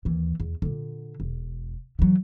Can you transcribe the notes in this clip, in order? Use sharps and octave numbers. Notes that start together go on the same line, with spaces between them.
D#2 E3
E2
A#2 D3
E1
E3 F#3